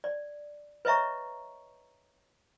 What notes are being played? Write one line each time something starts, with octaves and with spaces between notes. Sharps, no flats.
D5
B4 C#5 D#5 E5 A#5 C#6